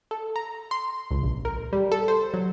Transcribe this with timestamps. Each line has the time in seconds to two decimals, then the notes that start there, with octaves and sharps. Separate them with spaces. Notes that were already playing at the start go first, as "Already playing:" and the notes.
0.11 A4
0.36 A#5
0.71 C6
1.11 C#2
1.23 A#1
1.45 A#4
1.73 G3
1.92 A4
2.08 C5
2.34 F#3